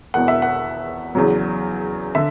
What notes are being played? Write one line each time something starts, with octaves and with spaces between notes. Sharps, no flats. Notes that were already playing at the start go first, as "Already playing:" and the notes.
E1 E2 B2 F#5
E5
F#5
E2 C#3 F#3
D3 E5